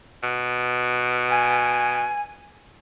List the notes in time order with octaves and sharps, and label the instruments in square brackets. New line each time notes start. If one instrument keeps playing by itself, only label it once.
[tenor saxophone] B2
[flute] G#5